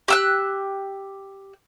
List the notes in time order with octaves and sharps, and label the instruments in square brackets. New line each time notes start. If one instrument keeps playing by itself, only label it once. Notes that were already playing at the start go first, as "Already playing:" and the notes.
[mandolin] G4 E6 F#6